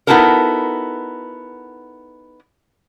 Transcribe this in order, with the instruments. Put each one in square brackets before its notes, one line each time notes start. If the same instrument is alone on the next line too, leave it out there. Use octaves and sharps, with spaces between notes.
[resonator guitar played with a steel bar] B3 D#4 E4 F#4 A4 A#4